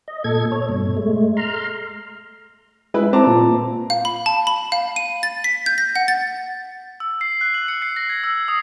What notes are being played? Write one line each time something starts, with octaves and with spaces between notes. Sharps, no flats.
D#5
A#2 A4 G#6
C#5
G2 B2
G#3 A3
A#5 C6 F6
G#3 E4 B4
C4 A5 A#5 D6
A#2
F5
B5
A5
B5
F5
D#7
A6
B6
G6
A#6
F#5
A6
E6
C7
F#6
F#7
C#7
C7
A#6
G#6
E6
D#6